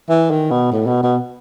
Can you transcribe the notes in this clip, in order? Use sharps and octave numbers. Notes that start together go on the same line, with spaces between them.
E3
D#3
B2
A2
B2
B2